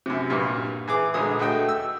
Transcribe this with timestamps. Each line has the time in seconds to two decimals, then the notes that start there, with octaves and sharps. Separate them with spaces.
0.06 F#2 C3
0.30 B1 G2 A#2
0.88 E3 G#4 D6
1.14 A#1 D3 G#3 D#6
1.39 A3 F#4 D#5 G5
1.69 E6